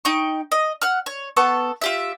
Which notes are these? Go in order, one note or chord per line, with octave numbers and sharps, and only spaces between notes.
D#4 G5 C#6
D#5
F#5 F6
C#5
B3 A4 C#6
F4 G4 E5